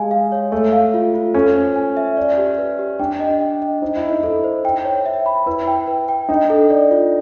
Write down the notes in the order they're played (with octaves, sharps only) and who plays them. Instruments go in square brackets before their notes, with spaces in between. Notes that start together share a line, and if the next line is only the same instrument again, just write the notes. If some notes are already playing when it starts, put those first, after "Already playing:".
Already playing: [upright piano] G#3 [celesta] G4 F5 G#5
[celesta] F5
C#5
[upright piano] A3 [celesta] C#5
[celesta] F5
F4
F4
[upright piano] C#4 [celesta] A4
[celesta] C5
G#5
E5
D5
G4
B4
G4
[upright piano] D4 [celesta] G5
[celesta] D#5
G5
D#5
[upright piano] D#4 [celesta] C5
[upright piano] E4
[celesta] D#5
[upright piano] D#4
[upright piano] E4 [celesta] A4
[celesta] C5
G5
C#5
E5
B5
[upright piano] E4 [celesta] B4
[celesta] G5
B4
G5
[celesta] D4 [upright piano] D#4
[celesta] A4
D5
F4